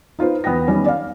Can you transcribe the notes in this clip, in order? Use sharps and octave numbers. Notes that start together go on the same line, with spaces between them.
D#4 F4 B4 C5
E2 B3 F#5 G5 A#6
D#3 G3 B3 C#4
D5 F5